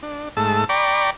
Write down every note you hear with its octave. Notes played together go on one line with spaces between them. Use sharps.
D4
G#2 A3 A5 E6
D5 G5 A#5 B5 C#6 D6